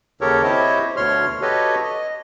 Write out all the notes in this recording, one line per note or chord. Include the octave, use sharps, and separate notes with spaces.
D#2 C#3 G4 A4 A#4 C#5
C4 E4 G4 C5 C#5 D#5
D2 B2 D3 C#5 C6 F6
F#4 G4 A4 B4 C#5 D#5
D#5